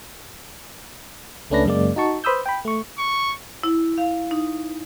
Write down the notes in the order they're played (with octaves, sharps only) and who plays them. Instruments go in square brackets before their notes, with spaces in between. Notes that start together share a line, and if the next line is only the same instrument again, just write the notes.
[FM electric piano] C#2 A3 C#4 D4 B4 A#6
F#2 C#3 G#3 A#3 D5
D#4 F#4 A5 C#6
B4 C5 B5 D#6 E6 G6
G5 B5
A3 C#6
[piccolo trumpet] C#6
[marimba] E4
F5
D#4